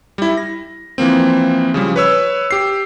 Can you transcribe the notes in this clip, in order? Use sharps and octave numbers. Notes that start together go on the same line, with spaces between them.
G3 E4
A#6
E3 F3 A#3 C4
C#3 F3 G3
B4 C#5 E6
G4 C7